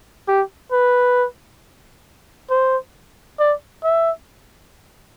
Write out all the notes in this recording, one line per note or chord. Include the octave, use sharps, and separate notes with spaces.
G4
B4
C5
D5
E5